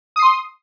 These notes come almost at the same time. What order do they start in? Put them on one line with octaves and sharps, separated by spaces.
D#6 C7 C6